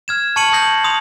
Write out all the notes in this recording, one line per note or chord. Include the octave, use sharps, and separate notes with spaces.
F6 G#6 E7
A5 C#6 F6 C#7 D#7 F#7
D#6 G6 A#6 C7 F#7
C6 D#6 F7